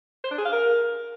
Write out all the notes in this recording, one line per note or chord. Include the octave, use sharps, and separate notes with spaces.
C5
D4
G#4
F5
A#4